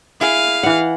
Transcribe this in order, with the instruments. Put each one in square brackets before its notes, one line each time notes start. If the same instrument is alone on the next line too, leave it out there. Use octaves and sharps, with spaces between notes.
[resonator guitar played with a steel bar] E4 G#4 [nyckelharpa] F5
[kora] E3 F#5